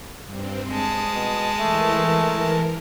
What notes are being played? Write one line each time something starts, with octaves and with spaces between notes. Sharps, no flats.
G2 C4
G#3 A5 D#6
B2
E3 A3 A#4